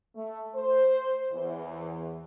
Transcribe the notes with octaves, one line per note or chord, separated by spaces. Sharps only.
A3
C5
E2